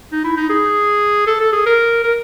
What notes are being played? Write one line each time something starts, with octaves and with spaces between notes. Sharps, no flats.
D#4
E4
D#4
G#4
A4
A4
G#4
A#4
A#4